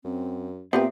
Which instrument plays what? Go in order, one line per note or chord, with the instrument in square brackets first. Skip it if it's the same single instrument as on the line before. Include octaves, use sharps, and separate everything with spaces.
[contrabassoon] F#2 [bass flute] C4
[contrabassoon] A#2 [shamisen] B3 G4 B4 [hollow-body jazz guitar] C4 [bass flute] E5